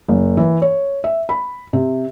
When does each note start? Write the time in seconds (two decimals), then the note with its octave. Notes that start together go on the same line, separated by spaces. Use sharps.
0.08 F#1
0.37 E3
0.62 C#5
1.04 E5
1.29 B5
1.73 C3